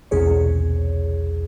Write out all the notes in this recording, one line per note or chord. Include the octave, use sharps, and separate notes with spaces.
B1 E2 C3 G#4 C#5